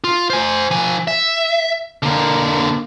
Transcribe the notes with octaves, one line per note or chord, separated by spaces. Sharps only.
F4
C5 G#5
F3 G#5
E5
D3 A#3